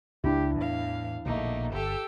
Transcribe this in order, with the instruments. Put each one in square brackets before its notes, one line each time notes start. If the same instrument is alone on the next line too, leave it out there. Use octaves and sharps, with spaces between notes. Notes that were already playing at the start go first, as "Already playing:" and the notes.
[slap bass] C#2 [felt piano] D4 E4 [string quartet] G4
[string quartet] E2 F5 [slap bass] A2 E3
[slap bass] A#1 B2 D3 [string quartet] A3 A#3 D#4
[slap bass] G1 [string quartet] G4 A4 E6